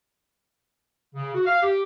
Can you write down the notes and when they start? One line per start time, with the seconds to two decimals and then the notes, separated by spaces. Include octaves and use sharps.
1.15 C#3
1.34 F#4
1.46 F5
1.63 G4